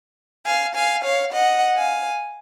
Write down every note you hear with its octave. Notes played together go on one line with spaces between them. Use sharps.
F5 G#5
F5 G#5
C#5 F5
D#5 F#5
F5 G#5